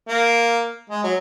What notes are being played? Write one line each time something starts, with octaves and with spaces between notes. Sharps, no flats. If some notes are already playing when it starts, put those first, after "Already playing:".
A#3
G#3
F#3